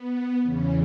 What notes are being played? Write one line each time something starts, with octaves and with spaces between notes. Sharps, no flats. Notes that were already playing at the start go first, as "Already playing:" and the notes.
Already playing: B3
E2 C#3 E3 C#4